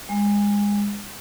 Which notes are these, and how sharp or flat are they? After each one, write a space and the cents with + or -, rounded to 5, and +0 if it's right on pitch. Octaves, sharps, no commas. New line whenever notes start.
G#3 -25